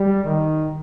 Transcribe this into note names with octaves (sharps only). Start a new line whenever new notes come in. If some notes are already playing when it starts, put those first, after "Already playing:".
Already playing: G3
D#3